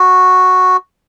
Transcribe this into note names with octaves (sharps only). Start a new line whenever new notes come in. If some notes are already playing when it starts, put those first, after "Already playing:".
Already playing: F#4